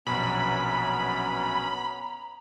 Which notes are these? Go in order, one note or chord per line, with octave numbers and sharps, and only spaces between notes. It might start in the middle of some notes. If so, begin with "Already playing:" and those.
A#1 F#2 B2 B3 C#4 A#5 B5